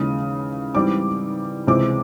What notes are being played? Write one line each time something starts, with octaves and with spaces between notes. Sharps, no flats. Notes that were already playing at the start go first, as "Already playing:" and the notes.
Already playing: D#2 C#3 E3 G#3 D#6
G#2 E3 G3 C4 D6
C#2 C3 E3 G#3 C4 D6